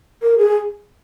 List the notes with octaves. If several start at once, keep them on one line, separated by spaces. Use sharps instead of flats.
A#4
G#4